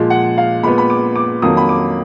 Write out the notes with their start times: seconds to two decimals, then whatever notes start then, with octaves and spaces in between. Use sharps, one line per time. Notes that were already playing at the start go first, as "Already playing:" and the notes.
Already playing: A#2 F3 G#3
0.10 F#5
0.38 F5
0.63 A#2 G#3 B3 B5
0.78 B5
0.90 D6
1.16 D6
1.42 F2 D#3 F#3 A#3 D#6
1.57 B5
1.69 D6